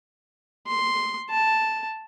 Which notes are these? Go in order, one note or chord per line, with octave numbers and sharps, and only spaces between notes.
C6
A5